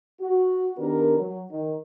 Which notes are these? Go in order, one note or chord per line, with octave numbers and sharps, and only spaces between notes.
F#4
D#3 B3 D4 G4 A#4
F#3
D#3